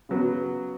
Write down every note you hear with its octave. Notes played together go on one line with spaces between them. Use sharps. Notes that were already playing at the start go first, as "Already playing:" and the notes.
C#3 F#3 B3 F#4